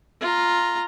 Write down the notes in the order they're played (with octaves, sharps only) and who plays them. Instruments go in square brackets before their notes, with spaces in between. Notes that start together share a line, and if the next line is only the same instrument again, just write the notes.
[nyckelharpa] F4 A#5